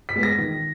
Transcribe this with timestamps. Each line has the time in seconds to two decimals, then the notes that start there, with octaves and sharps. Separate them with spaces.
0.09 B6
0.16 G#3 B3
0.23 A#6
0.38 D#3